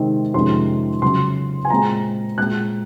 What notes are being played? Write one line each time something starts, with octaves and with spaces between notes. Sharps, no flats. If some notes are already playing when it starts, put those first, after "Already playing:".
Already playing: C3 D#3 G#3 C4
F2 C3 D#3 G#3 C#4 C6
C#3 F#3 C#4 C6
G#5
A#2 G#3 C4 A#5
A#2 G#3 C4 F#6